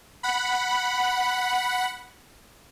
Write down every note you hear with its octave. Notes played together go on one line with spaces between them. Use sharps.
F#5 B5